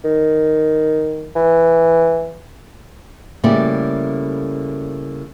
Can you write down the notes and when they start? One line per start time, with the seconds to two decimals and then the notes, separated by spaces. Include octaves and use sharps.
0.05 D#3
1.36 E3
3.44 A2 C#3 G3 A3 A#3 D5